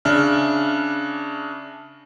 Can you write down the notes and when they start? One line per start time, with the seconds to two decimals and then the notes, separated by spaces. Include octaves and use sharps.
0.05 C#3 D4 E5 F6